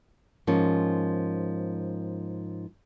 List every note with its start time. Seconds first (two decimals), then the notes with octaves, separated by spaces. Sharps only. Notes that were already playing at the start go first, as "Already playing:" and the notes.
0.47 G#2 F3 A#3 C#4